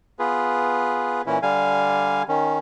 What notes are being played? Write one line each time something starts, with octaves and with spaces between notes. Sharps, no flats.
B3 F4 G#4 B4
A#2 E3 C#4 E4
D3 G3 F5 G#5
D#3 C#4